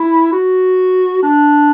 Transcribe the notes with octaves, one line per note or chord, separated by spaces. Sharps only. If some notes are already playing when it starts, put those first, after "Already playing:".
Already playing: E4
F#4
D4